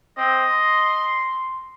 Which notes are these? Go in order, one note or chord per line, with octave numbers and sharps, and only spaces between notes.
C4 D#5
C6